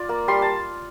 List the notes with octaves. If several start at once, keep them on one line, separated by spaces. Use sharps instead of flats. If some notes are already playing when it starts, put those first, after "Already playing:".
Already playing: F4 D5
A#3
G3 C6
A5